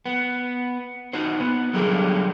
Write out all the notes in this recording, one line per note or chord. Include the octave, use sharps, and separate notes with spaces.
B3
D#4 F#4 C5
B3
D3 F#3 G3 G4 G#4 A#4